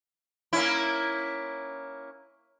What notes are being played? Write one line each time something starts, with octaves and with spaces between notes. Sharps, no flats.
A#3 C#4 E4